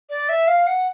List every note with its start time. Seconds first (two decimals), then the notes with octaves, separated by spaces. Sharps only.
0.10 D5
0.29 E5
0.48 F5
0.67 F#5